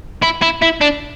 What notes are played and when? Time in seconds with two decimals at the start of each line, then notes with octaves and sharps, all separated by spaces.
0.22 E4
0.42 E4
0.62 E4
0.81 D4